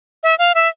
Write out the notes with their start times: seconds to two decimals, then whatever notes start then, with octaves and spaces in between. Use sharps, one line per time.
0.23 E5
0.38 F5
0.55 E5